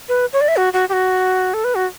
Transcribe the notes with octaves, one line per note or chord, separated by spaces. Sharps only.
B4
C#5
D5
E5
F#4
F#4
G4
F#4
A4
B4
F#4